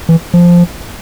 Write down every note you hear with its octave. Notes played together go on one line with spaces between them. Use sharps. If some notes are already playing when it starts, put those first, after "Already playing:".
E3
F3